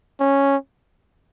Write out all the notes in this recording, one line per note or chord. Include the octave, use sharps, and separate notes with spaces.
C#4